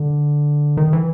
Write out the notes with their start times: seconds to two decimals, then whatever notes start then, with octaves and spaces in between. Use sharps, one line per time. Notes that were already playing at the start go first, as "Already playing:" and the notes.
Already playing: D3
0.77 D#3
0.93 E3